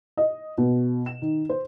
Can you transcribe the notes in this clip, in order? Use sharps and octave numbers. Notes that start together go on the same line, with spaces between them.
D#5
B2
E7
D#3
C5